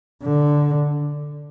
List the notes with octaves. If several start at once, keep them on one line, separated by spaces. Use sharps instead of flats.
D3